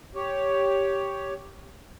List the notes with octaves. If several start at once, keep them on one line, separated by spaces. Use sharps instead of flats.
G4 C#5